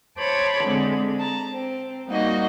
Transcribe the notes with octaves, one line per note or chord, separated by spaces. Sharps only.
C5 C#5 A5 B5 D6
D3 G#3 C4
A5 A#5
C4
G3 A#3 D#4 F#4 D#5